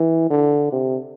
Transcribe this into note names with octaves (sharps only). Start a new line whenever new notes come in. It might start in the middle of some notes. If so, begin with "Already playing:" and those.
Already playing: E3
D3
C3